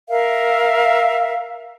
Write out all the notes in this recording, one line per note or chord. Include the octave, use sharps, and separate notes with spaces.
A#4 E5 F5